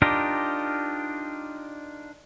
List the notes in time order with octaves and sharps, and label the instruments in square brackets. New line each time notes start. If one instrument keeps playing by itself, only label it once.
[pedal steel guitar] D4 D#4 F4 G4 A#4